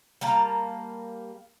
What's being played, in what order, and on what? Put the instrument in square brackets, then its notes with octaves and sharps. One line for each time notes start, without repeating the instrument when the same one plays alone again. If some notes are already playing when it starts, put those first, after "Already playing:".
[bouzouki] G3 A#3 A5 A#5